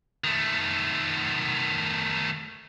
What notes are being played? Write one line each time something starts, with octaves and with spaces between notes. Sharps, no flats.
D#3 A3